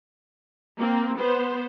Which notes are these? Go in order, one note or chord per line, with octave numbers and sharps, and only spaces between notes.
A#3 C4
B3 C5